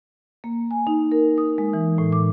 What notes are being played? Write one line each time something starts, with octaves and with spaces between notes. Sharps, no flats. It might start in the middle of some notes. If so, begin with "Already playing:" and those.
A#3
G#5
D#4
A#4
D#6
G#3
E3
A2
D6